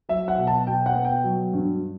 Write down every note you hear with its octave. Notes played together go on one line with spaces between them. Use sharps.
F#3 E5
F#5
B2
A5
B2 G5
F#5
B3
G5
F#3
G2